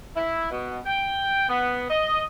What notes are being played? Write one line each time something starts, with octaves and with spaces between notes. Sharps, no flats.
E4
B2
G5
B3
D#5